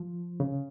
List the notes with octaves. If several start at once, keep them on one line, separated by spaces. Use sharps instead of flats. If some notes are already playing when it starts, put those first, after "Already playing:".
Already playing: F3
C#3